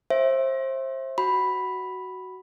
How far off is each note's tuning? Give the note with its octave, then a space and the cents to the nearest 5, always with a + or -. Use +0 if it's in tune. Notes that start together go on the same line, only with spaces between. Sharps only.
C5 +25 E5 +0
F#4 +10 B5 +0